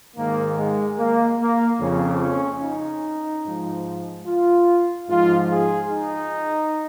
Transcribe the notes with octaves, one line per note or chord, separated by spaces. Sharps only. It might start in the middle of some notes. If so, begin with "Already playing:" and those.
G#2 D#3 A#3
G#3
A#3
A#3
F2 C#3 F3 C#4
C#4
D#4
G#2 F3
F4
G#2 F3 F4
G#4
D#4